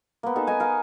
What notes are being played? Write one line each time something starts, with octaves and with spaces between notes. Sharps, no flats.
A#3 B3
D#4 A4 G#5 A5
D#4 D#5 G#5
A#4 F5